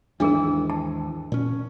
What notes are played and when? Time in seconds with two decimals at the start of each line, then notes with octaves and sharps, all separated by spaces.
0.20 D#2 G#2 E3 D4 G#4 A#4
0.70 A5
1.32 A#2 C#4